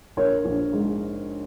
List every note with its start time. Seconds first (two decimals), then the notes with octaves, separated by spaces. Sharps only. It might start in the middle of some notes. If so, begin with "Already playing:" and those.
0.17 A#1 A#4 C#5
0.45 A#1
0.73 G#2